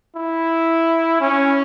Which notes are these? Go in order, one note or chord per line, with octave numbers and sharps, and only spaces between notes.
E4
C#4